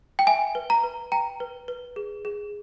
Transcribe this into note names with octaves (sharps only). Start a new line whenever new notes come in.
G5
E5 G#5
B4
A#5
B4
G5 A#5
B4
B4
G#4
G#4